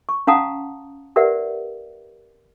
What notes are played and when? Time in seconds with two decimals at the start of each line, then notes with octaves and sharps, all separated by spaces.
0.09 C#6
0.27 C#4 F5 F#5 A5 A#5 D#6
1.16 G4 A#4 B4 D5 E5 F#5